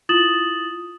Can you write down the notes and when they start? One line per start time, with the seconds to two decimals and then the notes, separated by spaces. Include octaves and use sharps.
0.09 E4 F4 D#6 A6 E7 F#7